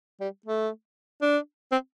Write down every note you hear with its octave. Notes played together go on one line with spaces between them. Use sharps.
G3
A3
D4
C4